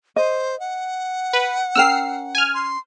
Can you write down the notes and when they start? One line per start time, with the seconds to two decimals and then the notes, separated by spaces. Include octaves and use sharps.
0.16 C5 D#5
0.60 F#5
1.33 B4
1.75 C#4 A#4 G5 E6 F6 C7
2.35 G#5 F6
2.54 C6